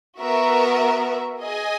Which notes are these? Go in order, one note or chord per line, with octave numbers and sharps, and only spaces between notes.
B3 F#4 A#4 E5
G#4 D#5 G#5